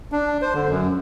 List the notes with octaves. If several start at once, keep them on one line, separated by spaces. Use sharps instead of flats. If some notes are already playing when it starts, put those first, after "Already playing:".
D4
C5
D3
F#2